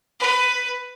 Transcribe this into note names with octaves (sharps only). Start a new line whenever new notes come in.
B4